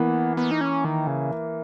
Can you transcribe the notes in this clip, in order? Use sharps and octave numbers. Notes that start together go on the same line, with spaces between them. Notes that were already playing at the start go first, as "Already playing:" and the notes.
Already playing: E3 A#3 B3
B3
D#4
C#4
D#3
C#3